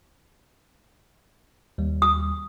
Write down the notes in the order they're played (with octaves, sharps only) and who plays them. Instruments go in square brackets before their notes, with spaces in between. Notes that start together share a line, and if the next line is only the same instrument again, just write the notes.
[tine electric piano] D#2 G3
[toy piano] D#6